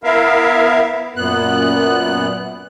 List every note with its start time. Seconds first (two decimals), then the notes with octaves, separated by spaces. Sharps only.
0.04 B3 E4 A#4 E5 F5
1.16 F#2 A#2 B3 F#6